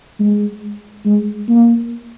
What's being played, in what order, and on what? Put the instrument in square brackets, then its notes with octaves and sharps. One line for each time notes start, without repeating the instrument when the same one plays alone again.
[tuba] G#3
G#3
A#3